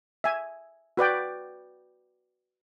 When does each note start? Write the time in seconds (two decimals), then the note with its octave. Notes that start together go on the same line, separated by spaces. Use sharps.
0.24 E5 G#5
0.97 F#4 B4 D5 G5